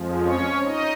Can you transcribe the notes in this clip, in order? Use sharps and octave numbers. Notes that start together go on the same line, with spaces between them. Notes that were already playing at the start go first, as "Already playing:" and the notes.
Already playing: F2 F3 G#3
C#4 C#5
D#4 D#5